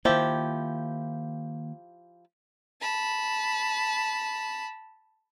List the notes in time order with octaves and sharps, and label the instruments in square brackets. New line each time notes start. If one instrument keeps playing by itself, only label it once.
[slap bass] D#3 A#3 [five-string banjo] F3 E4 G4
[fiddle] A5 B5